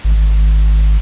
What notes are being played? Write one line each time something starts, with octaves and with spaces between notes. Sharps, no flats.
G#1